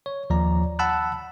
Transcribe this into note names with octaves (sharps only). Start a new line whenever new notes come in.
C#5
D#2 F3 D5 A#5
F#5 A5 B5 E6 F#6